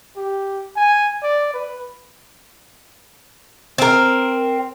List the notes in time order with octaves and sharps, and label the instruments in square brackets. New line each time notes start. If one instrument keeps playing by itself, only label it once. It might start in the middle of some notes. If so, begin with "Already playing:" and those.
[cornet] G4
G#5
D5
B4
[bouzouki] C4 A#4